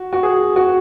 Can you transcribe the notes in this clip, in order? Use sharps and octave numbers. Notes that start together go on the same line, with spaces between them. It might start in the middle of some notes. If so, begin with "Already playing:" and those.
Already playing: F#4
F#4
G#4
F#4